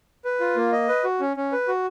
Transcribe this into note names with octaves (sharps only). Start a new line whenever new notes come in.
B4
F4
A#3
D#5
B4
F#4
C#4
C#4
B4
F#4